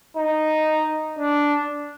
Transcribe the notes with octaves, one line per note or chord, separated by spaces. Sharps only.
D#4
D4